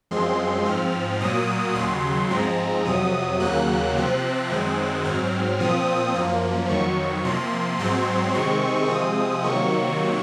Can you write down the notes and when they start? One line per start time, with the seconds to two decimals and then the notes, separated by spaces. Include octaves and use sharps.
0.11 F#2 F3 G#3 C4 C6
0.65 G#2 F3 C4 F6
1.20 A#2 F#3 A#3 D#6
1.75 D#2 C#3 F#3 C6
2.30 G#2 F3 G#3 C4 A#5
2.85 F2 C3 F#3 D#6
3.40 D#2 C#3 F#3 A#3 F#6
3.95 C3 F3 C4 F#6
4.50 F#2 D#3 G#3 C4 F#6
5.04 G#2 F#3 C4 F6
5.59 A#2 F3 C4 D#6
6.15 F#2 F3 A#3
6.69 F2 D#3 F#3 C#6
7.24 C3 F3 A#3 C6
7.79 G#2 F#3 C4 C6
8.34 C3 D#3 G#3 C4 C#6
8.89 C3 F3 G#3 C4 D#6
9.44 C3 D#3 F#3 A#3 C#6